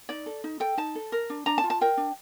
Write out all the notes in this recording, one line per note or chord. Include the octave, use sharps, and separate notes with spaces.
D#4 D5
A4
D#4
A4 G5
D#4 A5
A4
A#4
D4
D4 A#5
A5
F4
A5
A#4 G5
D4